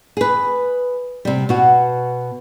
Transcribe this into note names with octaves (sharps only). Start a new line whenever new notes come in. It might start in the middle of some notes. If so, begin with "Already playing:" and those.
G#4 B4
C3 G3
B2 F#4